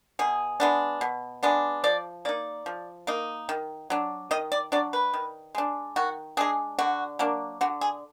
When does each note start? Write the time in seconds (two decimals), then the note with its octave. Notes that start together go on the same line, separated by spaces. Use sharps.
0.19 B2 G#4
0.60 G#3 B3 D4
1.01 B2
1.43 G#3 B3 D4
1.84 F3 D5
2.25 A#3 D#4 D5
2.66 F3
3.07 A#3 D#4
3.49 D#3
3.90 F#3 D4
4.31 D#3 D#5
4.52 D5
4.72 F#3 D4 D5
4.93 B4
5.14 D#3
5.55 G#3 D4
5.96 D#3 F#4
6.37 G#3 D4 G#4
6.79 D3 F#4
7.19 F#3 A#3 D4
7.61 D3 F#4
7.81 G#4